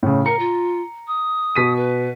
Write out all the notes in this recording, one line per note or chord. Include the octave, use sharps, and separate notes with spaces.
A2 C#3
A#4 A#5 C#7
F4
D#6
B2 B6 D#7
B4